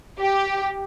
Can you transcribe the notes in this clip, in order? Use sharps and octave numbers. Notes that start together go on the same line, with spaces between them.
G4